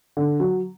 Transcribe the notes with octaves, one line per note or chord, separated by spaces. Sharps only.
D3
F#3